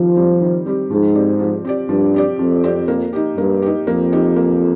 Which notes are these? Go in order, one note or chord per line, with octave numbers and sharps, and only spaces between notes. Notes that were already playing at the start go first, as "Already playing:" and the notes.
Already playing: D#3 F3 G3 C4 G4
G3 C4 G4
D#3
G3 C4 G4
G#2 F3
C4 G4 D5
F3
C4 G4 D5
G2 F3
C4 G4 D5
F2 F3
C4 G4 D5
A#3
D#4 G4
G2 A#3
D#4 G4
F2 A#3
D#4 G4
A#3